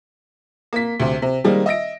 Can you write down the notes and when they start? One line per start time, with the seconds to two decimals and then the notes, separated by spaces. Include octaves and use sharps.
0.73 A#3 B6
1.00 D2 C3
1.22 C3
1.44 D#3 G3 G#3 A#3 C4 D#4
1.66 D#5 E5 A#6 D7